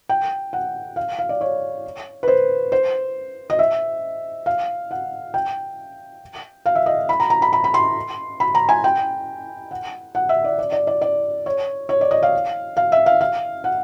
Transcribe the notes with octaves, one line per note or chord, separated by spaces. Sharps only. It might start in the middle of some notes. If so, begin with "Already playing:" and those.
G5
F#5
F5
F5
D5
C#5
B4
C5
C5
D#5
E5
F5
F#5
G5
F5
E5
D#5
B5
A#5
A#5
B5
B5
B5
C6
B5
A#5
G#5
G5
F#5
F#5
E5
D5
D5
D5
D5
D5
C#5
C#5
D5
D#5
F5
F5
E5
F5
F5
F#5